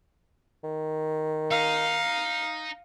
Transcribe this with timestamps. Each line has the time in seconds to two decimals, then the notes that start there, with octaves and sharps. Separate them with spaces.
0.64 D#3
1.51 D#4 F5 A#5